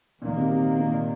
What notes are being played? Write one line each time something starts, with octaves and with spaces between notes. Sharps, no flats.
A#2 D#3 A#3
C3
C3
C3
C3
A#2